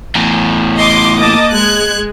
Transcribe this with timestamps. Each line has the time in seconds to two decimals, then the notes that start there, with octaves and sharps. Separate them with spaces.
0.15 E2 A2
0.77 D#5 C6 D6
1.18 A#3 D#5 A5 D6 D#6
1.53 G#3 F#6 G#6